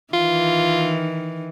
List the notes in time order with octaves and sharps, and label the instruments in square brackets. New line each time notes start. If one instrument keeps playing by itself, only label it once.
[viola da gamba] D#3 E3 [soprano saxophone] F4